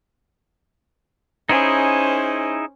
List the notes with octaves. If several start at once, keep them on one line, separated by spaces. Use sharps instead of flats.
C#4 D#4 E4 G#4 C5